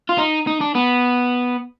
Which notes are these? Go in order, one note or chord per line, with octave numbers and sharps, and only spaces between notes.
F4
D#4
D#4
D4
B3